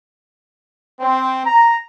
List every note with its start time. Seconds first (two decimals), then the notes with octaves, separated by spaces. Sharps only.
1.00 C4
1.45 A#5